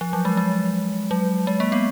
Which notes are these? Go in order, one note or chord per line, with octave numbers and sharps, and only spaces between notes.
F3
F#3
G#3
G#3
F#3
G#3
A#3
B3